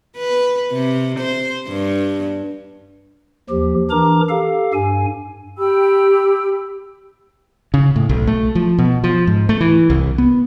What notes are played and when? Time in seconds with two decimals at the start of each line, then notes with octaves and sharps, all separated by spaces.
0.17 B4
0.72 C3
1.20 C5
1.68 G2
3.50 D#2 F3 G4
3.91 E3 D4 A#4 A#5 D6
4.29 G4 A4 F5
4.74 G2 G#5
5.57 G4 G5 B5 E6
7.74 C#3
7.96 A2
8.09 B1
8.27 A3
8.55 F3
8.78 B2
9.04 F3
9.27 G#2
9.49 A3
9.61 E3
9.90 C2
10.18 B3